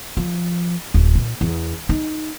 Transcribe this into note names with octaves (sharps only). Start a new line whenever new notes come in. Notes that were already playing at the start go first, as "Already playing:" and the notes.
F3
D1
A#2
E2
D#4